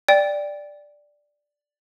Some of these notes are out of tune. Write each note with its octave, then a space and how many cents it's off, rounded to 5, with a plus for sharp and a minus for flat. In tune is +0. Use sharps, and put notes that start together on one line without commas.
D5 +0 G5 +10